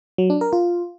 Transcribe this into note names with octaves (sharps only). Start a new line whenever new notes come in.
F#3
D4
A#4
F4